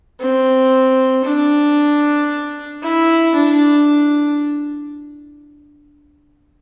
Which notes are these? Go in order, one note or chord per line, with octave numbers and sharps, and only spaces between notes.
C4
D4
E4
D4